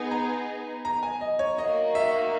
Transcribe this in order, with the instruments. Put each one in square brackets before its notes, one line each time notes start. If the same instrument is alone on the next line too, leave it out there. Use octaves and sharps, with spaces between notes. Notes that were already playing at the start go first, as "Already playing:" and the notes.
Already playing: [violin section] B3 D#4 G#4
[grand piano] A#5
A#5
G#5
D#5
C#5
[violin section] A#3 D#4 F#4 [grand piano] D#5
[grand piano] E5